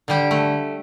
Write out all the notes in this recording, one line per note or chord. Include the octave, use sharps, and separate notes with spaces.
D3 G3 G4
A3